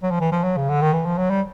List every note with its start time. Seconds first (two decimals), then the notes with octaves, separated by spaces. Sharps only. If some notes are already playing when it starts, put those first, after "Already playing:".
0.03 F#3
0.11 F3
0.20 E3
0.32 F3
0.44 F#3
0.57 C#3
0.69 D3
0.81 D#3
0.93 E3
1.05 F3
1.18 F#3
1.30 G3